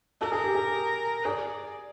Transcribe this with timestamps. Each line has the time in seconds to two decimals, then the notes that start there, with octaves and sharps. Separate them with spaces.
0.21 A4 A#4
0.32 G#4
0.44 G4
0.55 G#4
1.25 G#4 D5